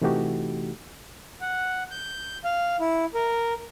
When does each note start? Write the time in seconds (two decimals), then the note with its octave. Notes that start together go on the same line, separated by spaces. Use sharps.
0.01 C3 E3 A3 D#4 F#4 G4
1.41 F#5
1.91 G6
2.44 F5
2.80 E4
3.14 A#4